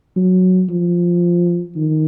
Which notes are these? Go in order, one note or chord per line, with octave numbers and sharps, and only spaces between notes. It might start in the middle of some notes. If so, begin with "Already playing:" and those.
F#3
F3
D#3